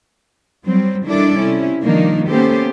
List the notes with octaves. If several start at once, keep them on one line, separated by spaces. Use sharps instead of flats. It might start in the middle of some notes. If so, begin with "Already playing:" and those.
F#3 G3 C4
D#3 G3 D4 E4 A4 D5
C3 C#4 E4
D#3 F3 G3 A#3 D4 D#4
A#3 B3 C#4 G4 A4 C5